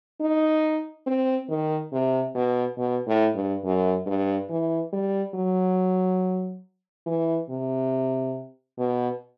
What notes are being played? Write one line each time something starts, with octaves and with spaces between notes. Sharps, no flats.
D#4
C4
D#3
C3
B2
B2
A2
G2
F#2
G2
E3
G3
F#3
E3
C3
B2